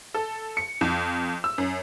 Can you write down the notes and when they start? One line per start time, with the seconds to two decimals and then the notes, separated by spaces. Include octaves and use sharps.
0.14 A4
0.57 C#7
0.81 F2
1.44 E6
1.58 F#2